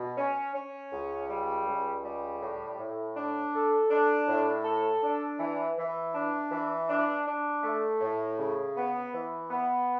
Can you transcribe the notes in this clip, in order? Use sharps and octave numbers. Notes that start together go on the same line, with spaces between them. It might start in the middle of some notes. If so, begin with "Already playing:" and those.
Already playing: B2
C#4
C#4
C#2
G3
C#2
G3
A2
A2
D4
A4
D4
A2
A4
D4
E3
E3
D4
E3
D4
D4
A3
A2
C#3
B3
E3
B3